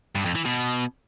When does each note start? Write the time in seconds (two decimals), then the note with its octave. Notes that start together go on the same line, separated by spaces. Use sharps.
0.15 G2
0.25 F2
0.35 E3
0.45 B2